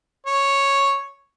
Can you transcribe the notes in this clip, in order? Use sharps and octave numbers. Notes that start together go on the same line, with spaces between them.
C#5